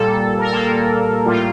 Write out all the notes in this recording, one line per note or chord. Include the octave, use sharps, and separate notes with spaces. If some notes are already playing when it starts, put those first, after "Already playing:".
Already playing: A#2 G3 A#3 A4
A#4
A#2 G3 A#3 A4
A2 G3 A#3 F4